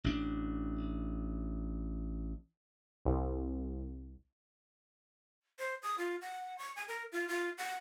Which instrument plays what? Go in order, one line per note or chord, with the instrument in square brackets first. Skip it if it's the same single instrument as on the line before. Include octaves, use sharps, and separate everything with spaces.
[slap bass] A1 D4
[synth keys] C2
[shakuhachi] C5
D#6
F4
F#5
C#6
G#5
A#4
F4
F4
F#5